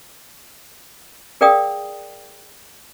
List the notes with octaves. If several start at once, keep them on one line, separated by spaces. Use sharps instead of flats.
G#4 A#4 D5 F5 G5 D#6